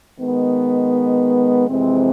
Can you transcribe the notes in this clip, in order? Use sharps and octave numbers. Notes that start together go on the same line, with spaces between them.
D#3 G#3 B3
F2 C3 E3 G#3 C4